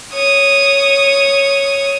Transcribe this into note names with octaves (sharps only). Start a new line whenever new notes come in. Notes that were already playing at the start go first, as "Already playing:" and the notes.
C#5 D#6